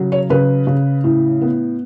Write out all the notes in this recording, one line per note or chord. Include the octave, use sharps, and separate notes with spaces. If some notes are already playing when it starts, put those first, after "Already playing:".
Already playing: C#3 F#3
C#5
C#3 B4
C#3
A2
B3